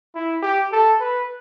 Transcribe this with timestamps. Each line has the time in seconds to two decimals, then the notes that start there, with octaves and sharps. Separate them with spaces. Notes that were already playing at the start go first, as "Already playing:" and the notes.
0.15 E4
0.43 G4
0.72 A4
1.00 B4